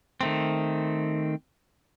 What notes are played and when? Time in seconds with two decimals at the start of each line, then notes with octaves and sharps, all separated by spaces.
0.21 D#3 A3 C4